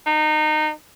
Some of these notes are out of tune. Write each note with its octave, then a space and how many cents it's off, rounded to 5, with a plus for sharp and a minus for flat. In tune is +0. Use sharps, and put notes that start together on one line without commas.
D#4 -25